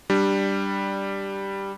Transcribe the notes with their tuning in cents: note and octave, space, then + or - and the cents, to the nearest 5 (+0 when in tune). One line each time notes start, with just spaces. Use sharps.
G3 +0 D4 +5